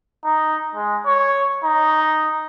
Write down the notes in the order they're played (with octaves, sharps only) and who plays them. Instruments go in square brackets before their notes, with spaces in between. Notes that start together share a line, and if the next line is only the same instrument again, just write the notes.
[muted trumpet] D#4
G#3
C#5
D#4